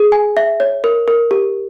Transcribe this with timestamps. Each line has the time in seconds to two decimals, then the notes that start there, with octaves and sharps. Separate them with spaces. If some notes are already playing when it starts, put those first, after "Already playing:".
Already playing: G#4
0.12 G#5
0.37 E5
0.60 C#5
0.84 A#4
1.08 A#4
1.31 G4